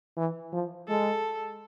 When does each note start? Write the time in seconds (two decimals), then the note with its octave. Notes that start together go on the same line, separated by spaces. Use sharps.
0.17 E3
0.53 F3
0.88 G#3 A4